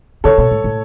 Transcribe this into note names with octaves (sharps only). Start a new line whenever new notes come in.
C#3 A4 C#5
B2
A2
A2